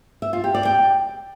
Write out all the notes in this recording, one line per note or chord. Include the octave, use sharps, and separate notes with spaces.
E5
F4
G4
D5
G5